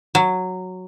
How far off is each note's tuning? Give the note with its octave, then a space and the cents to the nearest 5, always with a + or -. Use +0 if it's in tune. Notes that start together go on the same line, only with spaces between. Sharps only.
F#3 -5